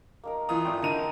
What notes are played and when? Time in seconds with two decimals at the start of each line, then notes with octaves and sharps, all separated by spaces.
0.24 A#3 D#4 A#4
0.49 E3 F4 D#6
0.65 G#1 A3 D5 G5
0.82 D3 D#4 A#4 D#7